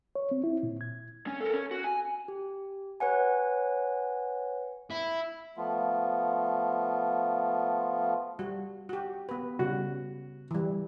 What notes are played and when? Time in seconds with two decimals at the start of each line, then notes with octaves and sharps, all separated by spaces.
0.15 C#5
0.31 C4
0.44 E4
0.63 A#2
0.81 G#6
1.27 C#4
1.41 A4 A#4
1.53 C#4
1.71 F#4
1.84 G#5
2.28 G4
3.00 B4 C#5 F#5 G#5
4.90 E4
5.58 F3 A3 B3 F4
8.39 G3 F#4
8.89 F#4 G4
9.29 B3 B4
9.59 C#3 G3 F#4
10.51 E3 G3